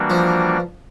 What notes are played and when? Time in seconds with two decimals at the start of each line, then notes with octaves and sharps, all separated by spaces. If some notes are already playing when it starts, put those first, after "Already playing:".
Already playing: E3 G3 A#3 D4 F#4
0.10 F3